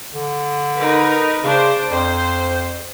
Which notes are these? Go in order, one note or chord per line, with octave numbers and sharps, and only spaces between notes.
D3
D#4 A#4 B4
C#3 D4 C5
F2 C5